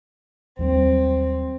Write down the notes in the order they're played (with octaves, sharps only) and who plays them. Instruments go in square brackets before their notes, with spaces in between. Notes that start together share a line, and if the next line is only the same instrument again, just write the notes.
[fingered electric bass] D#2 F#3 G3 [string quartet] C4